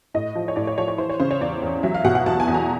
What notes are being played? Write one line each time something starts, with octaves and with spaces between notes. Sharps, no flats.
A2 D#5
F3
C#5
A2 D5
C#5
F3 C#5
C#5
E3 C5
C#5
C#3 C5
C#5
E2 D5
E2
F#3 E5
F5
B2 F#5
F#5
E2 A5
G#5
E2
A#5